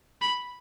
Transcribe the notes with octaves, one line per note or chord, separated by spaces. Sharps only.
B5